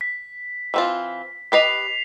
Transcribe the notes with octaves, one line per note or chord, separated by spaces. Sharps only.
B6
E3 C4 F4
G4 B4 D#5 B6 C7 F7